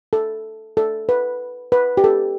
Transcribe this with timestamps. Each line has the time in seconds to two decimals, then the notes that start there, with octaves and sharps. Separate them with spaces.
0.13 A4
0.77 A4
1.09 B4
1.72 B4
1.97 G4
2.04 A4